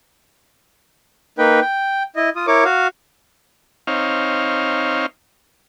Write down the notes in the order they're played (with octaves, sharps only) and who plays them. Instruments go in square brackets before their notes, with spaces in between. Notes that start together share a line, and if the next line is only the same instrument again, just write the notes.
[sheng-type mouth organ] A#3 D#4 B4 G5
G5
E4 D#5
F4 D#6
E4 A#4 C#5 D6
F#4 F5
[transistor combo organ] C4 D#4 C#5 F5